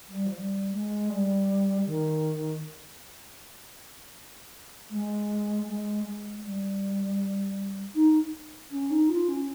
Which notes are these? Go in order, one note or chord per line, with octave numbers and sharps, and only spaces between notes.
G3
F3
G3
G#3
G3
D#3
G#3
G#3
G#3
G3
D#4
C#4
D#4
F4
C#4